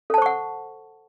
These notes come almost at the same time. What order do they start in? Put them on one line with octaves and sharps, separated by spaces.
A4 A5 C5 C#6 F#5